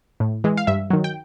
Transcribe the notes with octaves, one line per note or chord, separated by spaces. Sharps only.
A2
E3 G#3
F5
G2 E5
D#3 F#3
G5